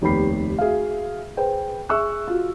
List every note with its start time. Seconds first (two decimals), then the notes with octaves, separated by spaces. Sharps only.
0.01 F1 D#2 B3 G4 B5 C7
0.59 F#4 G#4 E5 F5
1.37 G#4 B4 C5 G5
1.89 G#4 E5 C#6 E6 F#6
2.28 F4 F#4